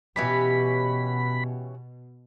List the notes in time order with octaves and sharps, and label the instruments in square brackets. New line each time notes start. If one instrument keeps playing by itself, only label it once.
[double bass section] B2 [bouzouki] E3 C#4 G4 [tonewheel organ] B5